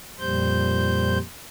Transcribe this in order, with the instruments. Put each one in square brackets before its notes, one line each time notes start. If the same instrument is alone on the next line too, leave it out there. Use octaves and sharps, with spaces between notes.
[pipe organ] F2 A#2 G3 C5 G6